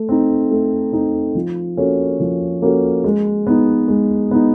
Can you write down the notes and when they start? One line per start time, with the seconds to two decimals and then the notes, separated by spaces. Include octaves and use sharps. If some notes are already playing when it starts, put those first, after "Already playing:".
Already playing: A3
0.09 C4 D#4
0.50 A3
0.93 C4 D#4
1.35 F3
1.77 A#3 C#4 F#4 A4
2.20 F3
2.62 A#3 C#4 F#4 A4
3.04 G#3
3.47 B3 D#4
3.88 G#3
4.31 B3 D#4